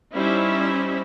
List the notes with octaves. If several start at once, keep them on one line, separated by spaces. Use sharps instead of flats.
G3 C#4 D#4 E4 C5 E5